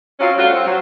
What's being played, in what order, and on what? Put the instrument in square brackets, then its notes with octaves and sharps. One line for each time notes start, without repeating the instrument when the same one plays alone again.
[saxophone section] F#3 C4 C#4 F4
G3 A3 F4 F#4
C4
F#3